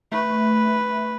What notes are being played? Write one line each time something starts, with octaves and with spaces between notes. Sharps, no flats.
A3 B4